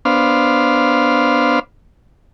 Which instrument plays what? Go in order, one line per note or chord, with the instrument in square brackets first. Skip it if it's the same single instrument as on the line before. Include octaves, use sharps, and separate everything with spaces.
[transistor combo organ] B3 D4 C5 F5